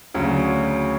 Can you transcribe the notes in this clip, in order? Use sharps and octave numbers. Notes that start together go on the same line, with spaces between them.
D2 C#3 F#3